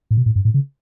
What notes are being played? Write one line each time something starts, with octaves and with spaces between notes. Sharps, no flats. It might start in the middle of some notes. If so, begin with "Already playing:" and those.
A2
B2
A2
G2
A2
C#3